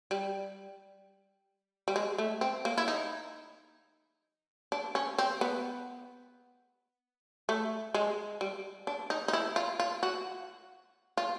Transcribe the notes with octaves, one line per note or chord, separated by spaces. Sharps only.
G3
G3
G#3
A3
C4
A#3
E4
D#4
D4
C#4
C4
B3
A3
G#3
G3
D4
D#4
D#4
E4
F4
F4
F#4
F4